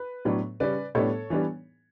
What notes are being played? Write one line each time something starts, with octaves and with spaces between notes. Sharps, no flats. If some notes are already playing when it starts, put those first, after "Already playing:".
Already playing: B4
A2 F#3 B3 D4
C#3 G3 C#4 B4 D5
A2 G3 B3 D4 A4 C#5
E3 G3 B3 D4